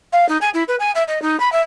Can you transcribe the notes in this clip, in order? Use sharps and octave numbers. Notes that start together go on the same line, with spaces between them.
F5
D#4
G#5
E4
B4
G#5
E5
D#5
D#4
B5
E5